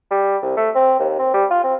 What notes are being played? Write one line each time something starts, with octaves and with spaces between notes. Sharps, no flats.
G3
C2
A3
C4
D#2
C4
G3
F4
C4